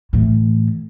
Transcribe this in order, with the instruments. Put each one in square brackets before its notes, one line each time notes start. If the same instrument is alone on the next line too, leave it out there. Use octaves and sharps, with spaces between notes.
[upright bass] A2 E3